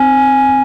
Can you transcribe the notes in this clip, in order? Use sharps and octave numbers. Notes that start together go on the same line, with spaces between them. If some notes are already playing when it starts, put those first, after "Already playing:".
Already playing: C4 G#5